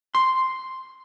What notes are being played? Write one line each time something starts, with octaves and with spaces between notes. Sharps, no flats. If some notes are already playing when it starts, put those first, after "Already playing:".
C6